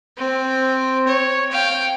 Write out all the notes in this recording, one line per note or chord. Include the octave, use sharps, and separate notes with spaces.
C4
C#5
F5 G5